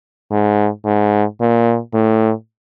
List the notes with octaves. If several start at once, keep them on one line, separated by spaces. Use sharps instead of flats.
G#2
G#2
A#2
A2